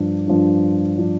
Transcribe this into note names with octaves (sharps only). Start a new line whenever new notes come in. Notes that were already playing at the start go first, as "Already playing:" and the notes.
Already playing: G2 F3 D4
G2 F3 D4
F3 D4